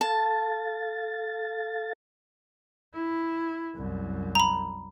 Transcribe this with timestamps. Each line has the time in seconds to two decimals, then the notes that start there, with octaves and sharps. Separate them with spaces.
0.01 A4 F5 A5 A6
2.94 E4
3.75 C2 F#2
4.35 A#5 B5